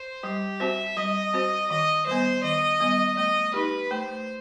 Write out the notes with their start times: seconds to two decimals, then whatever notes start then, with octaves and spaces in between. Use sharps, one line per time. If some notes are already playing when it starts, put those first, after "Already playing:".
Already playing: C5
0.23 G3 G4
0.60 C4 F#4 C5 E5
0.97 G3 D#5
1.33 C4 F#4 C5
1.70 D#3 D#5
2.07 G3 B3 C5
2.43 D#3 D#5
2.80 G3 B3
3.17 A3 D#5
3.54 D#4 G4 B4
3.91 A3 C5